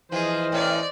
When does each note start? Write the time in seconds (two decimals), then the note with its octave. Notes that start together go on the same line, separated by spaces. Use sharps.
0.12 E3 F3 G#4 C5 D#5
0.52 A2 C#4 D5